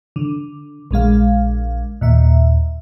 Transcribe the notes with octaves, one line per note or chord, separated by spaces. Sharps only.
D3
A#1 D3 G#3 F5
D#2 A#2 E5